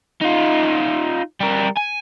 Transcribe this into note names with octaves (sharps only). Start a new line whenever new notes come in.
D#4 F4
G3 A#4
G#5